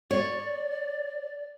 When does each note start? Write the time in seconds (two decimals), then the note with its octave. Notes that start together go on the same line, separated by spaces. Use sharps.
0.11 C#5 D5